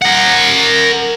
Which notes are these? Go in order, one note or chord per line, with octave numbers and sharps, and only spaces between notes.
A#4 F#5